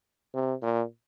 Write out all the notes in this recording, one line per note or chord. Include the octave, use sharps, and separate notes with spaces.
C3
A#2